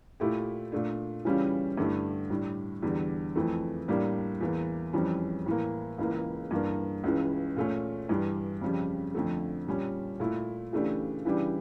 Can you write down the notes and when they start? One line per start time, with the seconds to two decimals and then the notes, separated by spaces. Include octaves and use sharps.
0.20 A#2 A3 E4 G4
0.72 A#2 A3 D4
1.25 C#3 E3 G3 C#4 F4
1.77 G2 D3 A3 E4 G4
2.30 A2 G3 D4
2.83 E2 D3 G3
3.35 F2 E3 A3
3.88 A2 G3 A#3 D4
4.41 E2 E3 A#3
4.93 F2 E3 G3 C#4
5.46 A2 E3 A#3
5.98 C#2 C#3 E3 A#3
6.51 G2 E3 A#3 D4
7.04 C#2 C#3 E3
7.56 A#2 A3 C#4
8.09 G2 E3 G3 D4
8.61 F2 C#3 G3
9.14 F2 D3 F3 A3
9.67 A#2 G3 C#4
10.20 A#2 A3 E4
10.73 C#3 E3 A3 D4 G4
11.25 C#3 E3 G3 D4 G4